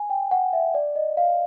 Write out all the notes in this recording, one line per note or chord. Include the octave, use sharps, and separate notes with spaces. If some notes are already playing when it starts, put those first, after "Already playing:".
Already playing: G#5
G5
F#5
E5
D5
D#5
F5